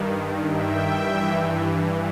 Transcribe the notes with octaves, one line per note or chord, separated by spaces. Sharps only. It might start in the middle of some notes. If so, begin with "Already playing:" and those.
Already playing: G2 D#3
E5 G5
G2 E3